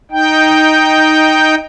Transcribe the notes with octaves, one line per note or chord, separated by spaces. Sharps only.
D#4 G5